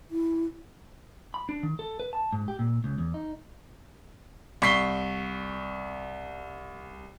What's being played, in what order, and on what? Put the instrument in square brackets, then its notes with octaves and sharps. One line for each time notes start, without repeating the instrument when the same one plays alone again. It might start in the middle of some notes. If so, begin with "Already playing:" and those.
[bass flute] E4
[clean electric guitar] B5
D4
D#3
A4
B4
A5
G#2
G4
A#2
C#2
E2
D#4
[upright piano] C2 C#6 B6 C7 G7